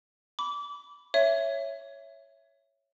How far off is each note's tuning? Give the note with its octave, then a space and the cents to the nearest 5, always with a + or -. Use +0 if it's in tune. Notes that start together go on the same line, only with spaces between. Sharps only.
B5 +5 D6 -25
C#5 +0 E5 +10